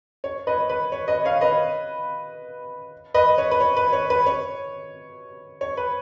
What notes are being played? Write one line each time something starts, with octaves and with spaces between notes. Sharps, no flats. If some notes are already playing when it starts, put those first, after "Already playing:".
C#5
B4 D#5
B4
C#5
B4 D#5
C#5 F5
B4 D#5
B4 D#5
C#5
B4
C#5
B4
C#5
B4
C#5
C#5
B4